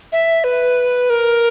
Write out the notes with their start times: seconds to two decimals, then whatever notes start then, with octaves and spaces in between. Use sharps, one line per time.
0.12 E5
0.44 B4
1.10 A#4